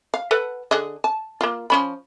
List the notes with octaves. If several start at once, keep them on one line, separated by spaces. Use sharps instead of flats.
F5
A4 B4 F#5
D3 G#4 D#5
A5
A#3 F4
F3 C#4 B5